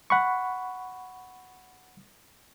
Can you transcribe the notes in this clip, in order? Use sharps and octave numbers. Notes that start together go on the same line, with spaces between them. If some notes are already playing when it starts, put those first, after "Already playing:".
F#5 B5 C#6